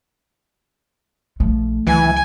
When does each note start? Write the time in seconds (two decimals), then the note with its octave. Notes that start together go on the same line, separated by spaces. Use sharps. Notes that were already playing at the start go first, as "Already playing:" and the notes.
1.40 A#1 F3 A3
1.87 C#2 D#3 E3 F#3 G#5